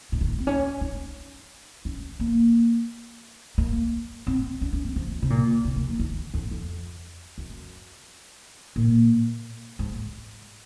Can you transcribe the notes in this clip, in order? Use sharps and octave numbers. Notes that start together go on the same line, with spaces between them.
A#2
D#3
C4
C#4
D#4
C#4
A#3
A#3
C4
C#4
C#4
C4
F3
C3
A#2
C3
A#3
F3
D#3
F2
F2
F#2
A#2
G#2